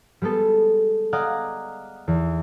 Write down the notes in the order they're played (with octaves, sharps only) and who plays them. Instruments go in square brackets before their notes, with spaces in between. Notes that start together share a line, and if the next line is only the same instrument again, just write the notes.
[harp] G3 G#3 B3 A4
D5 D#5 F5 F#5 G#5 A#5
E2